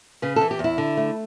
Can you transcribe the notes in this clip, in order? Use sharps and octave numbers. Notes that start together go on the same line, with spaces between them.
C#3 B4
A4
E3
G4
E2
E4
D3
A3